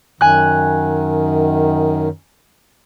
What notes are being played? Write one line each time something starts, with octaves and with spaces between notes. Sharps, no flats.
F#2 D#3 G#5 F#6